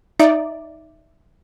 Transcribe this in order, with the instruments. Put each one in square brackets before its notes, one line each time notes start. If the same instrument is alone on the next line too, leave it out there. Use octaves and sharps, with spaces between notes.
[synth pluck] D#4 D5 [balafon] E5